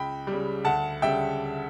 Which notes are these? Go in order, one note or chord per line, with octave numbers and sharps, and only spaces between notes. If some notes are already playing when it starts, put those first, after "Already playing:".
Already playing: C#2 G5 B5
C#3 G3
D2 F#5 A5
C#3 G3 E5 G5